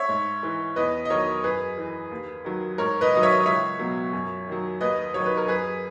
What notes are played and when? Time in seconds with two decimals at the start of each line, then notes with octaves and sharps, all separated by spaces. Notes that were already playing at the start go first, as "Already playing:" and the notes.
Already playing: C#5 E5
0.09 G#2
0.43 E3
0.76 E2 B4 D#5
1.05 D#5
1.10 D#3 F#3 A#4 C#5
1.44 F#2 G#4 B4
1.78 E3
2.11 D#2
2.44 D#3 F#3
2.78 G#2 A#4 C#5
3.01 B4 D#5
3.12 D#3 F#3 D#5
3.23 C#5 E5
3.46 C#2 C#5 E5
3.79 B2 F#3
4.13 F#2
4.47 D#3 F#3
4.81 D#2 B4 D#5
5.14 D#3 F#3 C#5
5.26 B4
5.37 A#4
5.48 F#2 G#4 B4